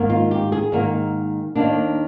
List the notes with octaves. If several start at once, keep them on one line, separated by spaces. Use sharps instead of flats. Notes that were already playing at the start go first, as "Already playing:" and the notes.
Already playing: G#2 D#3 A#3
F4
G4
G#4
G#2 D#3 A#3
D#2 D#3 A#3 D4